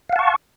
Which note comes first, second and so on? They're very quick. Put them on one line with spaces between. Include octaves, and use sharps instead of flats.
F5 F#5 A5 C#6